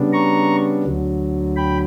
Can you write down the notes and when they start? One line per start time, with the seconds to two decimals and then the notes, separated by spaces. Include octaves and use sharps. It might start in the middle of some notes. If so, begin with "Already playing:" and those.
Already playing: C#3 G3 B3 D4
0.13 A#5 C#6
0.84 D2 D3 F#3
1.56 G5 B5